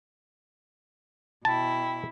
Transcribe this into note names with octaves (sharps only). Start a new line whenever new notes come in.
B2 E4 G5 A5 B5